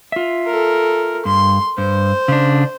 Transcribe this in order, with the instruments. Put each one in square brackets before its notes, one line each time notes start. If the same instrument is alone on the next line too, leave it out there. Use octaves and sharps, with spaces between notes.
[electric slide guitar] F4 E5
[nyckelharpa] A4 A#4
[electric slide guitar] G2 [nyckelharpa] C6
[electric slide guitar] G2 [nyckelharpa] C5
[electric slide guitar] C#3 D4